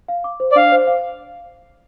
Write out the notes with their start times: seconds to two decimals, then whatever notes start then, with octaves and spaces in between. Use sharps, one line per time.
0.08 F5
0.24 D6
0.40 C5
0.52 D5
0.56 D4 F5
0.72 C5
0.87 F5